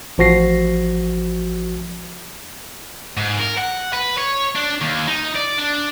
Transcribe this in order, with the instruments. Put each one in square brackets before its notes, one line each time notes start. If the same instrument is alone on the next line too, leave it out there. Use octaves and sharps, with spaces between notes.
[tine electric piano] A1 F3 F#4 A#6 C7
[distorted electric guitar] G#2
A#4
F#5
B4
C#5
D4
D#2
D#4
D5
D4